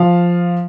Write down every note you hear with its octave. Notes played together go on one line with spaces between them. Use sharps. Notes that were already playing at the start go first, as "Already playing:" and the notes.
Already playing: F3 F5